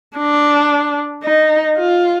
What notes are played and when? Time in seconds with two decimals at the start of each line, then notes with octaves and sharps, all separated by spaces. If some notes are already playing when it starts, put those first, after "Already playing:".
0.17 D4
1.24 D#4
1.77 F4